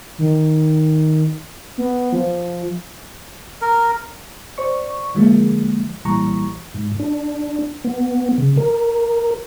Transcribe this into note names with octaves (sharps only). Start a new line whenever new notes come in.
D#3
B3
F3
A#4
C5 D5 C#6
D3 F3 G#3 A#3
B1 A#2 E3 G3 A#5 C#6
G#2
D4
B3
C#3
A#4